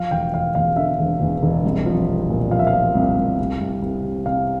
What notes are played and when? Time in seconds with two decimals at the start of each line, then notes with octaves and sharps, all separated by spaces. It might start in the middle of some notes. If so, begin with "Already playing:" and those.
Already playing: F3 F5
0.11 E1 G5
0.34 E1 F5
0.55 E2 F5
0.76 D3 E5
0.99 E1
1.21 E2
1.43 E1
1.65 C2
1.86 F3
2.08 C2
2.29 A#2
2.51 F3 F5
2.59 E5
2.67 F5
2.73 F3
2.95 C2
3.17 C2
3.39 C2
3.61 C2
3.82 C2
4.04 C3
4.25 C3 F5